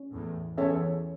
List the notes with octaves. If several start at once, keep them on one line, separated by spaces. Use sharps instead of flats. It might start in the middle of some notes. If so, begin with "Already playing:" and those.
Already playing: C#4
E2 A2
E2 C#4 A4 C#5 E5